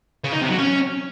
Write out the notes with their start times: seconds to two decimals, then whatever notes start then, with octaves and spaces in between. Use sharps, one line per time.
0.24 C#3
0.33 D#4
0.41 C3
0.50 F#3
0.58 C#4